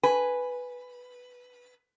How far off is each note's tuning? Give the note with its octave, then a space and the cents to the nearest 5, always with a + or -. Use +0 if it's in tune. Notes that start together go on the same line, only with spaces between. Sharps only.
B4 +0 G#5 +0